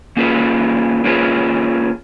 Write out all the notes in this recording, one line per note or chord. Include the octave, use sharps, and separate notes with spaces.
A#3 C#4 F4 G#4 B4
A#3 C#4 F4 G#4 B4